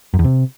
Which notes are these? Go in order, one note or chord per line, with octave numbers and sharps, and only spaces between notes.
F#2
E2
C3